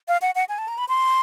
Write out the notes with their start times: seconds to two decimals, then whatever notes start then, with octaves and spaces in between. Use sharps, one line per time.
0.08 F5
0.22 F#5
0.35 F#5
0.49 G#5
0.58 A5
0.68 A#5
0.78 B5
0.89 C6